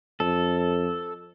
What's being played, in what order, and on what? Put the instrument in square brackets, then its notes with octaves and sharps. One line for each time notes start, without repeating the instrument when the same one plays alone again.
[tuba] F2 [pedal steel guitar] A4